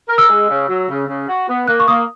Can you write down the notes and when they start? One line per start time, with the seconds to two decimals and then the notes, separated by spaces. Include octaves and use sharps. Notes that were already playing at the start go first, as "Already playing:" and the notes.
0.08 A#4
0.18 E6
0.28 G#3
0.48 C#3
0.68 F#3
0.89 C#3
1.07 C#3
1.28 F#4
1.48 B3
1.68 A#3 F#6
1.80 C#6
1.88 A#3 D#6